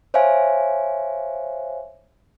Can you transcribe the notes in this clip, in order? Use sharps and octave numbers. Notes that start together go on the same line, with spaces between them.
C5 C#5 E5 F5 G#5